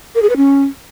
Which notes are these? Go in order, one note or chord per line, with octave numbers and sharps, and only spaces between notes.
A#4
G#4
B4
C#4